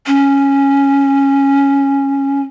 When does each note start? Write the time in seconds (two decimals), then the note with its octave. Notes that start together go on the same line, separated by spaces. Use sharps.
0.07 C#4